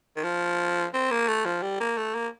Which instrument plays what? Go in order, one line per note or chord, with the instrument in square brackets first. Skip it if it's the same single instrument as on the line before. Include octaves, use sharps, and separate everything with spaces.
[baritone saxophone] D#3
F3
C4
A#3
A3
F3
G3
A#3
A3
A#3